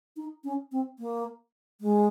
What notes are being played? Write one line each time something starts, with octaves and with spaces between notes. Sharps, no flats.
D#4
C#4
C4
A#3
G#3